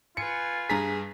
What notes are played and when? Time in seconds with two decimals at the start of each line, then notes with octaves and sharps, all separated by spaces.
0.17 F4 B4 G#5 C#7
0.70 G2 G#4 A#5 B6